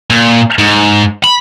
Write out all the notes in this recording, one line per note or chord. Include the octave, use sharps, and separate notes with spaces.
A#2
G#2
B5